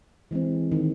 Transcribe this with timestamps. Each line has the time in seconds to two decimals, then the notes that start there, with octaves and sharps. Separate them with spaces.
0.31 E3 G#3 C4
0.72 D#3